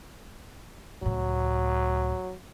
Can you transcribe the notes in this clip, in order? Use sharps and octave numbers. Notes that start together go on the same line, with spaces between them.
C#2 A2 F#3